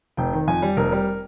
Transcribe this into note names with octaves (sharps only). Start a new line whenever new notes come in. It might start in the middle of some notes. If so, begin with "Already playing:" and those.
F1 G5
D#3
F2 G#5
G3
F1 A#4
G3